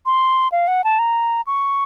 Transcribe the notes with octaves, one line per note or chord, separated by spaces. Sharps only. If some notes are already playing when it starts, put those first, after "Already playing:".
C6
F5
F#5
A5
A#5
C#6